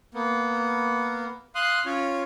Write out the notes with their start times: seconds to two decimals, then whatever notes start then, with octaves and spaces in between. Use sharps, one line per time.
0.14 A#3 B3
1.55 F5 C6 D#6 F#6
1.86 C#4 F4 C#5